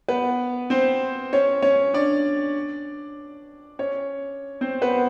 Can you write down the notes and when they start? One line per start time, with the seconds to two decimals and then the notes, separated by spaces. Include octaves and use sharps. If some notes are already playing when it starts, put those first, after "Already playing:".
0.08 B3 B4
0.70 C4 C5
1.33 C#4 C#5
1.62 C#4 C#5
1.94 D4 D5
3.79 C#4 C#5
4.61 C4 C5
4.82 B3 B4